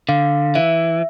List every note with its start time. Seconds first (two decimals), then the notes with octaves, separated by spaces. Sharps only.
0.09 D3 F5
0.55 E3 E5